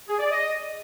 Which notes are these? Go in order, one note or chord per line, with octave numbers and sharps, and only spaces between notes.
G#4
D5
D#5